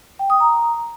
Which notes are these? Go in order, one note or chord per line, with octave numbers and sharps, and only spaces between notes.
G5
D#6
A#5